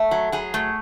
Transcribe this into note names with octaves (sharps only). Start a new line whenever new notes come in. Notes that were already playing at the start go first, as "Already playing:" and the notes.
Already playing: A3 A4
F#3
F#3 G#4
A3